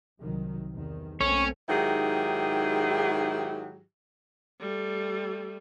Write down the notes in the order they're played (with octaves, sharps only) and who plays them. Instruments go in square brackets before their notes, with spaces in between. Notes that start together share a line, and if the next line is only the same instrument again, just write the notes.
[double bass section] C2 D#3 F#3
E2 C3 D#3
[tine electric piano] B1 [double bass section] A3 A#3 C4 [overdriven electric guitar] C#4 [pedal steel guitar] C#5
[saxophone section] G#2 D#3 F#3 E4 G4 G#4
[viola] G3 A3